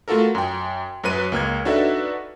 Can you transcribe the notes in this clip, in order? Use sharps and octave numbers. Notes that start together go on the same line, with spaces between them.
A3 F4 F#4 A4 A#4
F#2 G5
F#2 F#3 B4 D#7
C#2 A#3 F6 G#6
D4 D#4 F#4 A4 B4 E5